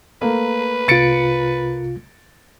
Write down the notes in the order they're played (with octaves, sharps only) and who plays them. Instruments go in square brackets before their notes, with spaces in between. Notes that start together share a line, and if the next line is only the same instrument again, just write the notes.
[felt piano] A3 A#3 [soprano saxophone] B4
[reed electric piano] C2 C3 F4 [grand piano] A6 C#7 D7